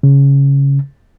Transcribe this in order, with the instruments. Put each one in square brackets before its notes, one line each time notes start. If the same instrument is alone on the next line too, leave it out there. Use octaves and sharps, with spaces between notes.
[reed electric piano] C#3